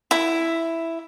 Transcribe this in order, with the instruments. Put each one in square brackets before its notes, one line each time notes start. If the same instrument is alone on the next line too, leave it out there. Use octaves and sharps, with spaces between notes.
[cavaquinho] E4